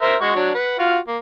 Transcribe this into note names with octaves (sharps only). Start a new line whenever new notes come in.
A#4 C5 E5
G#3 F#4 C#6
F#3 D4
B4 F#5
F4 F#4 F5
A#3